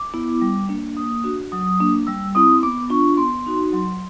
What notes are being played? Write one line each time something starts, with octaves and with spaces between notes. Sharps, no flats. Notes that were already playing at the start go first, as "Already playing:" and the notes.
Already playing: D6
B3 E4
G3
A#3 D4
A#3 D#6
D4 F#4
F#3 D#6
A#3 D4
G3 E6
C4 E4 D#6
B3 D6
D4 F4 C#6
B3 C6
D#4 F#4
F#3 C6